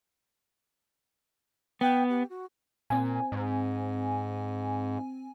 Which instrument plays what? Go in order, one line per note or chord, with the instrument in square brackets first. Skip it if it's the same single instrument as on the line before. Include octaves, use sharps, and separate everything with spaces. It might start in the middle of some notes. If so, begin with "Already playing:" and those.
[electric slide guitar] B3 [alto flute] G5
[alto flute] G4
F#4
[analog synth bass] A#2 [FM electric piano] C4 G#5
[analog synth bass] G#2